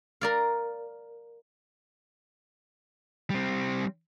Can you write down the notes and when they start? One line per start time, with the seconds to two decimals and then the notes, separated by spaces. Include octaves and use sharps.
0.21 A#4 D5 F5
3.30 G3 C4